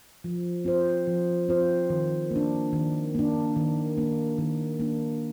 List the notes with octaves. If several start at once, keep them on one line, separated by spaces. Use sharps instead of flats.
F3
C4 F4 C5
F3
C4 F4 C5
D#3
A#3 D4
D#3
A#3 D4
D#3
A#3 D4
D#3
A#3 D4